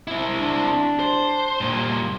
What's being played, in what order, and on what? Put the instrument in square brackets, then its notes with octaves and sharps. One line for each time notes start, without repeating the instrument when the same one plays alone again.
[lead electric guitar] C4 E4
[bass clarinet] D4
[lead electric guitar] C5
G2 A#2